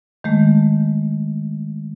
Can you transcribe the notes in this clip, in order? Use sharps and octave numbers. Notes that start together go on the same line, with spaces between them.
D#3 G#3 A3